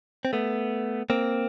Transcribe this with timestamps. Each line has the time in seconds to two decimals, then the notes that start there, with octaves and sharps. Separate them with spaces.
0.25 C4
0.33 A3 B3
1.10 A#3 C4